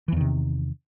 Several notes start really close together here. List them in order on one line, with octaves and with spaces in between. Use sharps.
E3 E2 D#3 C3